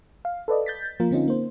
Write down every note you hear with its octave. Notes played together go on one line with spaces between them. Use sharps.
F5
A4 B4 D5 D#5
G6 A6 B6
F3 A#3 F4 A#4
D3 C4 C#4 D#4 F4
A#3 C5